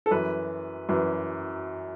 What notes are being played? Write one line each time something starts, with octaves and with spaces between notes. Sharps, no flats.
A4
F#2 E3 B4
F#2 E3